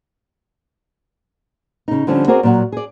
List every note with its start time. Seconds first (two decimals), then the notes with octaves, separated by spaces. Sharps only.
1.88 C#3 D#4
2.07 D3 F3 G3 C4 C#4
2.27 C4 F#4 G#4 A#4 C5 D5
2.43 A#2 F#3 F#5
2.72 G#4 D5